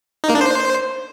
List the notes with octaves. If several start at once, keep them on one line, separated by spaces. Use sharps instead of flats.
D#4
A#3
D4
C5